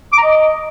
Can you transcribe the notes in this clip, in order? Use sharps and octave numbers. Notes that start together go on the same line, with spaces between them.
D6
A#5
D#5